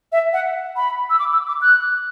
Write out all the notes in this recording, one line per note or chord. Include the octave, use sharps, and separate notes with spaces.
E5
F#5
B5
E6
D6
E6
D6
F#6